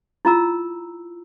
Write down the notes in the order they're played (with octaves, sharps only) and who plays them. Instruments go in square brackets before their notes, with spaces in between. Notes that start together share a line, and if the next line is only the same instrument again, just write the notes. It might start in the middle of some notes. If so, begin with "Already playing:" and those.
[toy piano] E4 F4 A#5 E6